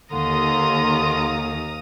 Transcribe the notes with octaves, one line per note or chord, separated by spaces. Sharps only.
D#2 D3 F5 A#5 C6 D#6